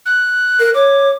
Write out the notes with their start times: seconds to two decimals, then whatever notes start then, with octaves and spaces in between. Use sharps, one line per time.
0.06 F#6
0.60 A#4
0.74 C#5 D6